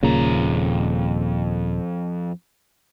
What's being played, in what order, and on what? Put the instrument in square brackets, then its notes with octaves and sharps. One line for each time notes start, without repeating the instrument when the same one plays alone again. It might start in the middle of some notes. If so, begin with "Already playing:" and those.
[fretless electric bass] D#1 A#2 C#3 [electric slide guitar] F2 A#5